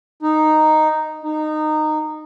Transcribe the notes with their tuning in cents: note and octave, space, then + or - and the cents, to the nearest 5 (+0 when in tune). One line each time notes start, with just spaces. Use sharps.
D#4 -5
D#4 -20